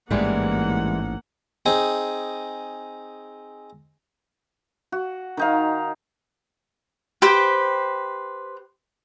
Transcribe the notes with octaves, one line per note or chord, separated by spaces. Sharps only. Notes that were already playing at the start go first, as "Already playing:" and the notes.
A1 G#2 E3 G3 G#3 A#3 F#5
C4 D#4 G#4
F#4
D#3 D#4 F5
G4 B4 C5 G5